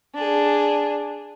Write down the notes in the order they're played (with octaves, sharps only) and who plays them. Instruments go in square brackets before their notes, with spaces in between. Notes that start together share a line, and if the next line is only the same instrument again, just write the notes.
[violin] D4 G#4